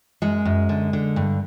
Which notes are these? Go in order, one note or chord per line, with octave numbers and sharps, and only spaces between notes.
F#2 G#3
F#2
D3
D3
G2